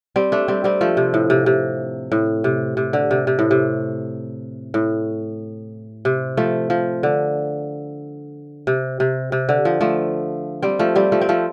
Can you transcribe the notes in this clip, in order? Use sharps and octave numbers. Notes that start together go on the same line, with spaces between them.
G3 C4
A3 D4
G3 C4
G3 C4
F3 A3
C3
A2
C3
C3
A2
C3
C3
D3
C3
C3
A2
C3
A2
C3
F3 A3
F3
D3
C3
C3
C3
D3
F3
F3 A3
G3 C4
F3 A3
G3 C4
F3 A3
C4
F3 A3